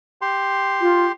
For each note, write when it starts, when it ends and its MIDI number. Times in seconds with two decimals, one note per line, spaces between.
0.22 1.12 67
0.22 1.12 84
0.81 1.05 65